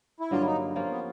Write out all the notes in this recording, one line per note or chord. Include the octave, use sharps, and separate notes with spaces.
E4
G2 D3 F#3 A#3 F4
E4
D#4
F3 A#3 C#4 F4
B3